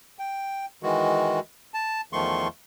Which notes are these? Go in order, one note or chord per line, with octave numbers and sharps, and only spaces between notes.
G5
D#3 E3 G#3 F#4
A5
E2 D#3 F3 A3 C6 C#6